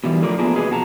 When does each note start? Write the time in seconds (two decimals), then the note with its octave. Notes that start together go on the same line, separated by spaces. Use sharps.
0.04 B2 D#3 E3 G3
0.22 D3 F3 A3 F4 A#4 D5
0.38 A#3 B3 D4 F4 G#4 A#4
0.56 C3 F#4 G#4 B4 D#5
0.71 B2 F#4 A5 A#5